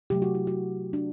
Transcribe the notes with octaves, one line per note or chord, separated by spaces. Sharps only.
C3 F#3 A3 G4
F#4
E4
F#4
D4